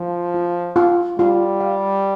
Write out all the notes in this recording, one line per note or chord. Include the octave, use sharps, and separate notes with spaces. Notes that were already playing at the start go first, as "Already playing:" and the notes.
Already playing: F3 F4
F4
F4
G3 F4
F5